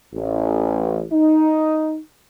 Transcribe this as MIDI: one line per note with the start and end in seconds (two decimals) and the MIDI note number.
0.14 1.04 33
1.12 1.98 63